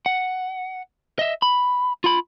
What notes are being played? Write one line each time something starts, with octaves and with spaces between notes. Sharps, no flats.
F#5
D#5 E5
B5
F4 B5